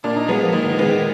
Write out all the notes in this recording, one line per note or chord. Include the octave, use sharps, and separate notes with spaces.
A#2 D4
D#4
F#3 G#3 B3
F3
A#2 D#3
D#3
G#3 B3
D#3